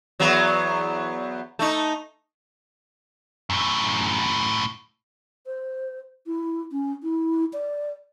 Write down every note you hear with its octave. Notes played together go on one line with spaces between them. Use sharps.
E2 F#3 B3
A3 D#4
F#2 A2
C5
E4
C#4
E4
D5